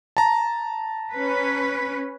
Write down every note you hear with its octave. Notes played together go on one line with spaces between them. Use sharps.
A5 A#5
C#4 B4